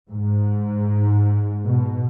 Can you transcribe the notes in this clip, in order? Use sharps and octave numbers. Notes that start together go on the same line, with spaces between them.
G#2
B2